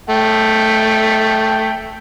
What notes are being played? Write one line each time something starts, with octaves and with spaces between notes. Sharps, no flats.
A3 G5